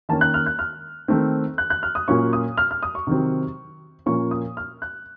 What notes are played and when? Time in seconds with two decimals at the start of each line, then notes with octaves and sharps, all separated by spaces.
0.09 D#3 A#3 C#4 A5
0.21 F#6
0.34 F6
0.46 F#6
0.59 F6
1.08 D#3 A3 C4
1.58 F#6
1.70 F#6
1.83 F6
1.95 D#6
2.08 A#2 F#3 A#3 C#4 C#6
2.33 D#6
2.58 F6
2.71 F6
2.83 D#6
2.95 C#6
3.07 C3 D#3 F#3 C4
4.06 A#2 F3 A#3 C#4 C#6
4.31 D#6
4.57 F6
4.82 F#6